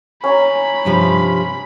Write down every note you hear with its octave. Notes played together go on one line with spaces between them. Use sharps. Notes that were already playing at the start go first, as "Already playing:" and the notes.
C#4 G#5 A#5 B5
G2 C3 F3